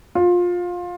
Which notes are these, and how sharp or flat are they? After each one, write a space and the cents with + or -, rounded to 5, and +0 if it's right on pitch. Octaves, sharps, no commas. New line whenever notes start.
F4 +20